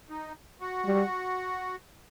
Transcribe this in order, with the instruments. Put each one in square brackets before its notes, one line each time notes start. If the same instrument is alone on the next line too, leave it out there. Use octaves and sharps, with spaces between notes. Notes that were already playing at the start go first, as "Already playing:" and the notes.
[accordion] D#4
F#4
[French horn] G3